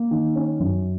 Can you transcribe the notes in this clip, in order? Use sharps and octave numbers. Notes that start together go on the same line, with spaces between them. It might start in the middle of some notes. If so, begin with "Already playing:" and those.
Already playing: A#3
D#3
C#4
F#2